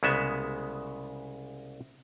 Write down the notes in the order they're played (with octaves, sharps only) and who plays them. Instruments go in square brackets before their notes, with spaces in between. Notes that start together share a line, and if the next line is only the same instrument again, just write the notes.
[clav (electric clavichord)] C2 C#3 G#3 B3 E5